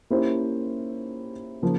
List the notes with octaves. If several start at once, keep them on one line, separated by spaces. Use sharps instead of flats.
A#3 C#4 E4 G4 C5
C#3 F3 A#3